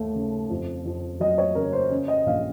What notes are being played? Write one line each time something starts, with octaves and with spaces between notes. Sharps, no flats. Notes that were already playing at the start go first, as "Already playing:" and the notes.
Already playing: D#2 A3
C#3
F2
F2
F#3 D#5
C#5
C#3 A#4
C5
C#4
D#5
A#1 F5